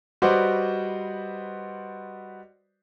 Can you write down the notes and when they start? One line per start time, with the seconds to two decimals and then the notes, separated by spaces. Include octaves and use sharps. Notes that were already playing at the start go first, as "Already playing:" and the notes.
0.22 G3 F#4 B4 C5 D5 D#5